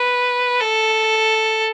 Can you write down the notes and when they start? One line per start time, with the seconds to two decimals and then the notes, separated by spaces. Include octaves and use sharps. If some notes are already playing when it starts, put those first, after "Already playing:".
Already playing: B4
0.60 A4